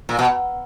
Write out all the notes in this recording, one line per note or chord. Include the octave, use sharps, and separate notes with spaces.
A#2
B2